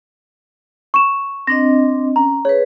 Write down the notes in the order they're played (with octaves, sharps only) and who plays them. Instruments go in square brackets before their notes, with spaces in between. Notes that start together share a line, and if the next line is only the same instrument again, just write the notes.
[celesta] C#6 E7
[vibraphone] C4 D4 D#5 [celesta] A#6
[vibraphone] C#4 [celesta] A#5
[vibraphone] G#4 B4 [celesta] C#5